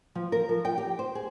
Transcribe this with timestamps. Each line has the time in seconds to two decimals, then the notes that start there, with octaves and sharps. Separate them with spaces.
0.15 F3
0.32 A#4
0.49 F3
0.65 G5
0.78 G4
0.99 C5
1.15 G#4